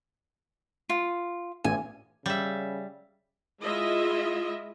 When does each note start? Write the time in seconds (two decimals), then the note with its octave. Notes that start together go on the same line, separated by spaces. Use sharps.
0.89 F4
1.64 A1 G#5
2.26 C#3 G3 E5
3.61 G#3 E4 F4 D#5 E5